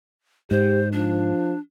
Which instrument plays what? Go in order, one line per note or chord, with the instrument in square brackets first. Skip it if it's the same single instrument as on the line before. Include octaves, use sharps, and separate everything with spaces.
[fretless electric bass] G#2 [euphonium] G4 [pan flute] C5
[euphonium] F3 [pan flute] D4